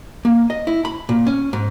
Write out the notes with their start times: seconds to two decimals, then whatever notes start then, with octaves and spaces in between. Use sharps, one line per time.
0.25 A#3
0.50 D#5
0.67 E4
0.85 B5
1.09 A#2
1.27 C#4
1.53 G#2